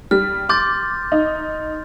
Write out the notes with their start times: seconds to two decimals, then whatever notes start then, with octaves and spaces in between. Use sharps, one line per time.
0.11 G3 F6
0.49 C6 D6 G6 A6
1.12 D#4